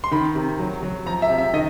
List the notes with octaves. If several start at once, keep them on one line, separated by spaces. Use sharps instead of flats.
C6
D#3 B5
C3
F#3
F#3
F3 A#5
E5
C3
E5
D#3 D#5